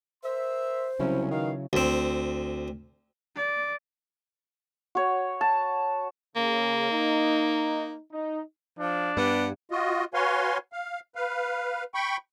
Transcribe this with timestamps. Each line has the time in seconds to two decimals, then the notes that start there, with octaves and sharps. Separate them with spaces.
0.23 A#4 C5 E5 C6
1.00 C2 C#3 F#3 C#4 E4
1.31 B2 D#3 F5
1.73 D2 C4
3.36 D5
4.95 F#4 C#5
5.41 A5
6.36 C#3 A#3
6.91 D#4
8.11 D#4
8.79 F3 D4
9.17 G2 B3 G4
9.71 F4 F#4 D#5
10.14 F#4 B4 C#5 F5 G#5 C6
10.72 F5
11.15 B4 F5
11.94 G5 B5 C#6